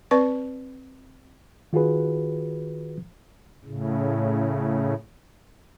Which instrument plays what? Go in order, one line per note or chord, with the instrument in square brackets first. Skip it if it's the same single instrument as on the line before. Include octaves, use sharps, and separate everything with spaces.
[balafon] C4 B4 D5 C#6
[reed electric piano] D#3 F4 F#4 G#4 B4
[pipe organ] A2 C#3